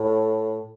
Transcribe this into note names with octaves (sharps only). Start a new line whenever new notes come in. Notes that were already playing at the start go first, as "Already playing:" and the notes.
Already playing: A2